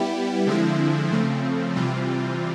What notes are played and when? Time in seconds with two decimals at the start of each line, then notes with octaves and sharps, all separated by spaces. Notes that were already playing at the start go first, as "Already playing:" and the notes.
Already playing: G3 B3 E4 G4
0.46 D3 F3 G#3 C4 E4
1.12 C#3 F3 A3 C4
1.76 C3 E3 G3 C4 F4